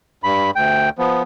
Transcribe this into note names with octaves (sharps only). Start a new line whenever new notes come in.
G2 B5
D2 G5
F3 B3